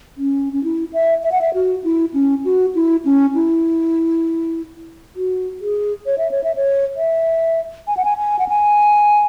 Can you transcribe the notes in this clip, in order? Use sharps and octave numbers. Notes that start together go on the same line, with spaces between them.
C#4
C#4
E4
E5
E5
F#5
E5
F#4
E4
C#4
F#4
E4
C#4
E4
F#4
G#4
C#5
E5
C#5
E5
C#5
E5
G#5
F#5
G#5
G#5
F#5
G#5